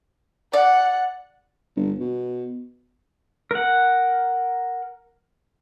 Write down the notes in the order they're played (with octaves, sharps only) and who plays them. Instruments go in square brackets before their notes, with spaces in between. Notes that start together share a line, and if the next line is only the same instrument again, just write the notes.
[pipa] D5 [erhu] F#5
[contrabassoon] G1
B2
[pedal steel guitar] A#4 F#5